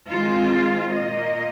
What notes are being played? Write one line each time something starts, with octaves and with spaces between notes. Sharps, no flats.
D#3 G#3 C4 F4
A#2 A#3 D#5